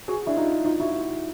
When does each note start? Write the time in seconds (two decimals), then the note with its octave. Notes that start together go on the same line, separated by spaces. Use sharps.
0.08 F#4 G#4
0.27 D4 E4
0.36 D#4 F4
0.65 D#4 F4
0.80 E4 F#4